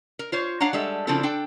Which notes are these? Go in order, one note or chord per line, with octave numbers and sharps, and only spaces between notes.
A#4
F4 C5 C#5
D4 C#5 F5 F#5 A#5
G3 G#3 A4 E5
C#3 F3 C4 D4 E4 A4
D4 A4 G5